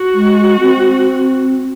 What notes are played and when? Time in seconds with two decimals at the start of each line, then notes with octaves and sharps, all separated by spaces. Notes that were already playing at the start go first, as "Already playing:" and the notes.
Already playing: F#4
0.14 G#3
0.61 C4